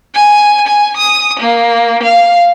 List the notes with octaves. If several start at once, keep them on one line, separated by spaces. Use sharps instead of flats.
G#5
G#5
D#6
A#3
F5